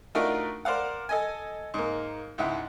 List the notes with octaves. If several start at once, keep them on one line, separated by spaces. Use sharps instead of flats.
A3 D4 D#4 F4 F#4 A#4
A#4 C5 D5 F5 F#5
A4 D#5 G#5
G#2 A#3
C#2 G#2 E4 F#5